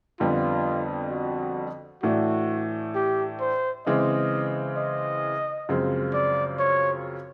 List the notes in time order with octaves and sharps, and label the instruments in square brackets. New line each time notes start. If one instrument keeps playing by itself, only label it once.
[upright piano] F2 D3 G3 B3 [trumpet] F4
[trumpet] F#4
[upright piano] A2 E3 A3 D4 [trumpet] F#4
[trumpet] G4
C5
[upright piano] C#3 E3 G#3 C4 [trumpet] D#5
[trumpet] D#5
[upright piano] F#2 C#3 F3 G#3 C4
[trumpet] D5
C#5